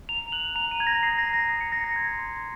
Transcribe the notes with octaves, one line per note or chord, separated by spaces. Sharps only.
A#5 F7
F#6 F#7
A#5 F7
D#7
A#5 G#6
A#6
D#6 C7
A#6
A#5
A#6
D#6 C7
C#7
A#5 A#6
A#6
C6 G#6
C6 A#6